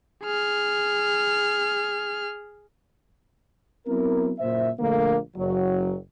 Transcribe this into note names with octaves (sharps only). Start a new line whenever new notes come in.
G#4 F6
F#3 B3 C4 E4 A#4
F#1 A#2 C5 E5
A#1 D3 A3 A#3
F#1 F#3